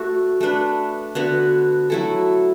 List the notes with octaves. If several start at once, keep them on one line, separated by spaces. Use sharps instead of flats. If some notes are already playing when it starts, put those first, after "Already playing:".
Already playing: A3 F#4 A4
A3 D4 B4
D3 B3 F#4 B4
F#3 A3 E4 A4